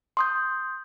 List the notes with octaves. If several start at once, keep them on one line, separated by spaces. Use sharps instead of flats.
C6 D#6 G6